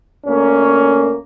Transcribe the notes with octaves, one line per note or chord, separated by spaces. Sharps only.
D2 A#3 C#4